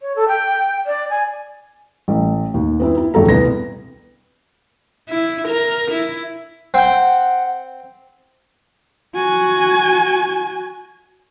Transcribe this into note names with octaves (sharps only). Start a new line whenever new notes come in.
C#5
A4
G5
D5
G#5
A1
D#2
B3 C4 E4
E4
D#1 A#1 E2 A2 A4 A#5
C2 B3 A#6
E4
A#4
E4
C4 F#5 G5
F#4 G#5